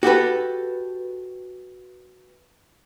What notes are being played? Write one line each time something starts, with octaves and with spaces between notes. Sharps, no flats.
F#4 G4 A4 B4